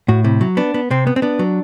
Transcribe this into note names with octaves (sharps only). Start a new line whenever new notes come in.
A2 F#4
C3 E4
F#3
B3 D4
B3
C3 C4
B3
C4
B3 D4
F#3